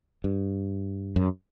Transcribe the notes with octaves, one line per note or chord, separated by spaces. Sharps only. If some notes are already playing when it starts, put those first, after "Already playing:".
G2
F#2